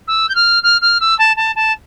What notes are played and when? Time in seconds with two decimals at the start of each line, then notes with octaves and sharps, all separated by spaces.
0.07 E6
0.28 G6
0.35 F6
0.63 F6
0.81 F6
1.00 E6
1.18 A5
1.36 A5
1.55 A5